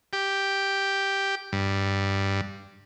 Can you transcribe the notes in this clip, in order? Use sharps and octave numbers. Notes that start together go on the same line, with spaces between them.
G4
G2